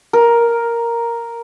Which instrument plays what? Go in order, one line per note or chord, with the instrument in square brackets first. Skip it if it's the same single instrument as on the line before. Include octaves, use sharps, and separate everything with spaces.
[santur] A#4